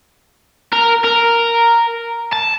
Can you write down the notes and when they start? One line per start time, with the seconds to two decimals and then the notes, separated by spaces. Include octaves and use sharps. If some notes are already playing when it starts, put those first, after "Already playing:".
0.73 A#4
1.04 A#4
2.33 A5